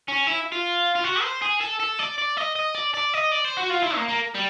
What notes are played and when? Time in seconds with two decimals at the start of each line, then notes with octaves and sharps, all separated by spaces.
0.08 C#4
0.27 E4
0.52 F4
0.96 F4
1.04 F#4
1.22 C5
1.42 G#4
1.61 A4
1.80 A4
1.99 D5
2.18 D5
2.37 D#5
2.56 D#5
2.75 D5
2.94 D5
3.14 D#5
3.32 D5
3.45 C5
3.57 F#4
3.70 F4
3.83 E4
3.96 A#3
4.08 A#3
4.34 G3